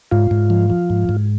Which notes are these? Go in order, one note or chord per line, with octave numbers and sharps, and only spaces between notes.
G#2 F4
G#2
F3
F3
G#2
G#2